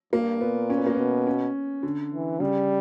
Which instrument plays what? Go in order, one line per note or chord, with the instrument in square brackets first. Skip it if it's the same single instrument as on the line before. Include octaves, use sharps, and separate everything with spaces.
[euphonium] G2 [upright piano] A#3
[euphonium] A#2 [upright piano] B3
[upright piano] C#4
B3
A#3
[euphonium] B2 [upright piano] B3
[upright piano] C#4
D3
[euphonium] E3
[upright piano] C#3 [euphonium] G3